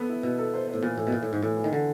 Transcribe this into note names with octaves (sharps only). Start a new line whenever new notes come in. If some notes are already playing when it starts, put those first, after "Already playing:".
Already playing: B3 A4
E4
B2 E4
A4
C5
C5
A2
A#2 E3
A2 E3
B2
A#2 E3
A2
G#2 E3
A2 E3
E3
D#3
D3 E3